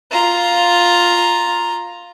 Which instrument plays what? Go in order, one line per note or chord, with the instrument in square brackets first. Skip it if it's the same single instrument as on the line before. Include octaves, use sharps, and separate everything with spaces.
[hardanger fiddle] F4 A#5